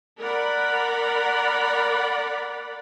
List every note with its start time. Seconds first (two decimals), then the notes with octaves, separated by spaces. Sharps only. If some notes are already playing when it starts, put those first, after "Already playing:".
0.20 A#4 D5 F#5 B5